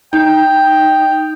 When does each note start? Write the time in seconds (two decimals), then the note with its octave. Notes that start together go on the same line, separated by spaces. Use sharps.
0.13 D#4 G5